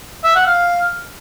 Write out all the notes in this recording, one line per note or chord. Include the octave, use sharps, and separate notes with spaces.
E5
F#5
F5